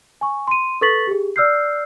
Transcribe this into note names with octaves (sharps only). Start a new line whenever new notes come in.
G#5 C#6
C6 D#7
A4 B4 C#6 A6 B6 F#7
G4 G#4
D5 E6 F6 G6 C7